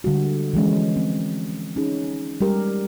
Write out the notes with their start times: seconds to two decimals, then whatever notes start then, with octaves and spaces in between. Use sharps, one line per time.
0.04 D3 G3 G#3 F#4
0.54 E3 F3 G#3 C#4
0.96 C4
1.76 C#4 D#4 G#4
2.41 G3 G#3 G4 A#4